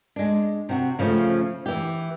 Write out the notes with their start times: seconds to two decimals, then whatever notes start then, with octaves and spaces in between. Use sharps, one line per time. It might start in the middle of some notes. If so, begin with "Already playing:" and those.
0.16 G#3 D4
0.69 C3 F#4
0.99 C#3 F3 G#3 A3
1.66 E3 G4